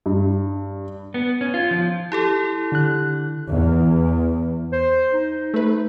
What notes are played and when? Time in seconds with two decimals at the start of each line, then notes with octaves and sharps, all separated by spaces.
0.06 G2
1.14 B3
1.41 C#4
1.54 F4
1.71 F3
2.12 E4 G4 A4
2.72 D3 F#6
3.50 E2
4.72 C5
5.12 D#4
5.54 A3 B4